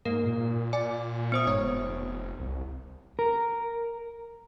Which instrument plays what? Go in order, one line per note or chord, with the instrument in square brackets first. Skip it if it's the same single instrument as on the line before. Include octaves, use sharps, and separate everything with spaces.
[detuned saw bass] G#2 [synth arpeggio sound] A#3 [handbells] A#4
[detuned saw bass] A#2
[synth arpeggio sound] D5 [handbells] G#5
[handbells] B3 C5 D#6
[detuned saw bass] F1 [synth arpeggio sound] G#2 C#5
[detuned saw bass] C2
[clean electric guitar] A#4